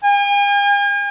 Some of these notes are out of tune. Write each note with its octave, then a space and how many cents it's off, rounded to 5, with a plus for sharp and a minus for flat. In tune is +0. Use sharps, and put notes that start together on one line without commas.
G#5 -45